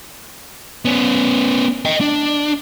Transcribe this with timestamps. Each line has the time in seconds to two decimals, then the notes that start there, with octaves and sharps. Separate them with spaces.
0.85 B3 C#4
1.85 D#5 G5
2.01 D4